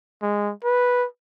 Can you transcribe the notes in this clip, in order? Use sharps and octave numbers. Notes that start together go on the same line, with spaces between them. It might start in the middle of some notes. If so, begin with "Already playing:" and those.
G#3
B4